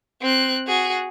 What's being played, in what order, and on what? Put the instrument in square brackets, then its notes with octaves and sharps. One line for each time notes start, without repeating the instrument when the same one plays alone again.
[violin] C4 F#6
F#4 G#4